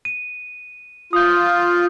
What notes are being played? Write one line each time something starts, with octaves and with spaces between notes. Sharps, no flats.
D#7
F4 D#6 G6